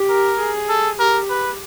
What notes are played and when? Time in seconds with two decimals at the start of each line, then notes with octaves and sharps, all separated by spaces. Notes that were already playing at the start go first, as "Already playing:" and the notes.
Already playing: G4
0.09 A#4
0.39 G#4
0.69 A4
0.99 G4 A#4
1.30 B4